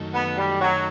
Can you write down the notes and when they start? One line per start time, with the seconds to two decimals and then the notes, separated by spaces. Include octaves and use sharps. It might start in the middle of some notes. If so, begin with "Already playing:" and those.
Already playing: F#2 D#3 A3
0.14 B3
0.37 G3
0.60 F#3